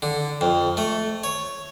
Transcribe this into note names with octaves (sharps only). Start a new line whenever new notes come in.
D3
F2
A3
C#5